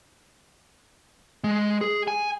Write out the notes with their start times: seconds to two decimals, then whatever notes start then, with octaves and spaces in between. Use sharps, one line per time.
1.44 G#3
1.81 G#4
2.08 G#5